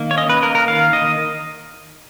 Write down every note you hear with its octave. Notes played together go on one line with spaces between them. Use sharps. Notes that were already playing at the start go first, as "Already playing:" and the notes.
Already playing: D#3 A#3
C#5
C#4 D#5
B4
A#3 A#4
A#4
D#3 F5
D#3 D#5